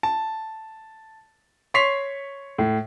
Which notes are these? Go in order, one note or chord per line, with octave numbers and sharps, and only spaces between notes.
A5
C#5 C6 C#6 B6 C7 F7
A2